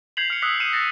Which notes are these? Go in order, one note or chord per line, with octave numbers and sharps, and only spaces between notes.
G6 G#6 B6 C7 F7 F#7
F6 C#7
D#6 E6 F#6 B6
F6 C#7 D#7 E7
A6 A#6 C#7